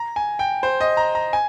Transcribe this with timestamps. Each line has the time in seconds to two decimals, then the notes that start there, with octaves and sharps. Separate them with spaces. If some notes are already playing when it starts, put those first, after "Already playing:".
Already playing: A#5
0.16 G#5
0.39 G5
0.63 C5
0.80 D#5
0.97 A#5
1.15 A#5
1.33 G#5